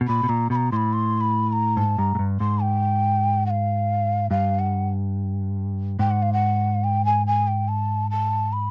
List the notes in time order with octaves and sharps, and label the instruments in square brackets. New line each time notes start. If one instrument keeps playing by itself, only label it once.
[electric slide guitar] B2
[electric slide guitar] A#2 [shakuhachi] B5
[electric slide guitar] B2
[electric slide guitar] A#2 [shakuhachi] A#5
[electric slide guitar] B2 [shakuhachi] B5
[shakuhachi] A#5
[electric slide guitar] A2 [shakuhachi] B5 C6
[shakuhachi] C6
B5
B5
A#5
[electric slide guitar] G#2 [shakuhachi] A5
[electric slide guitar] G2 [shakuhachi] A#5
[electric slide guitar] G#2
G2
[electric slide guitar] G#2 [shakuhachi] C6
[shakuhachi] G5
F#5
F5
[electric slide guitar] G2 [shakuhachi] F5
[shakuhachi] F#5
[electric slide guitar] G#2 [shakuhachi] G5
[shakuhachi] F#5
F5
F#5
G5
G#5
G#5
G5
A5
A5
B5